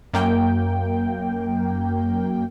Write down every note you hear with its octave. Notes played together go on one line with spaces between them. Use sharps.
F#2 A#3 G5